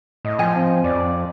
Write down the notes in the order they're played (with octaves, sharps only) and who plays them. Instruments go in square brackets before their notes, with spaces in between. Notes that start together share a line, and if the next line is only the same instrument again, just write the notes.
[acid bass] A2 [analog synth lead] D#5
[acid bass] F3 [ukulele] G#5
[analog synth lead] C4
[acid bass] F2 [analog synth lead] D5